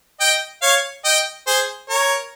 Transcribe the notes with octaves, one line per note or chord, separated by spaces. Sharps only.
D#5 G5
C#5 F5
D#5 G5
G#4 C5
A#4 C#5